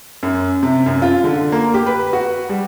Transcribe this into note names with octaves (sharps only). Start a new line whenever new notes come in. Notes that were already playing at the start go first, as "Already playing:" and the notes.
F#2
C3
F#2
F4
D3
A#3
G4
B4
F#4
G3